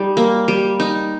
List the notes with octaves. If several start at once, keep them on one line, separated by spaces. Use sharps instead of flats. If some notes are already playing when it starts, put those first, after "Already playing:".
Already playing: G3 D#4
A#3
G3
D#4